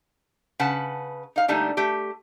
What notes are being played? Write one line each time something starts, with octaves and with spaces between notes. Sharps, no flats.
C#3 B4 F#5 A5
D#4 F5
D3 G3 A3 A#3 D#4
A3 G4